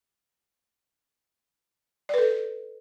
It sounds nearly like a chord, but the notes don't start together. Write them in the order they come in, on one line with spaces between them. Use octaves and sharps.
D5 B4 A4